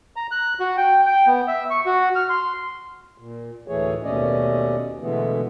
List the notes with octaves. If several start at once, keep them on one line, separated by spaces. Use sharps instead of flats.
A#5
F#6
F#4
G5
G5
B3
E5
C#6
F#4
F6
C6
A#2
D2 A2 E3 A3 G#4 C#5
D#2 B2 A3 C#4 D5 D#5
B2 D3 E3 G#3 A3 B3